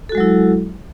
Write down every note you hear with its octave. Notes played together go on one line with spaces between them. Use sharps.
F#3 G#3 E4 F#4 A4